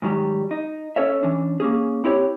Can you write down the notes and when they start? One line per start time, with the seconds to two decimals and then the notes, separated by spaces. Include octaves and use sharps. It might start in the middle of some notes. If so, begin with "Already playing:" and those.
0.02 G#2 D#3 F#3 G3
0.51 D#4
0.96 C#4 A4 C#5 E5
1.23 E3 C#4 D4
1.60 A#3 C#4 G#4
2.04 C4 E4 G4 C#5